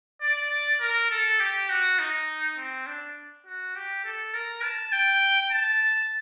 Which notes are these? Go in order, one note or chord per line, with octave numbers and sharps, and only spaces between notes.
D5
A#4
A4
G4
F#4
D#4
C4
D4
F#4
G4
A4
A#4
A5
G5
A5